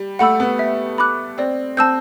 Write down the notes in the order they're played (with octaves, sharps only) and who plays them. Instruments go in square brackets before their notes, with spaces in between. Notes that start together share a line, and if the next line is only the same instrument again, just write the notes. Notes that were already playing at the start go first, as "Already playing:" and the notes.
Already playing: [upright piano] G3
[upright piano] A3 [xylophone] F#5 B5 E6
[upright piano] B3
[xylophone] E5
B5 D6 F#6
[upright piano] C4 [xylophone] D5
[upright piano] C4 [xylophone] A5 E6 G6